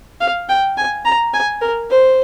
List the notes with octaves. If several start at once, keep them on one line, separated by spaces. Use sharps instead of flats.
F5
G5
G#5
A#5
G#5
A#4
C5